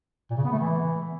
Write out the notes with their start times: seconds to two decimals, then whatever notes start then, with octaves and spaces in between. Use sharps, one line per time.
0.30 A#2
0.37 C#3
0.45 B3
0.52 A3
0.59 E3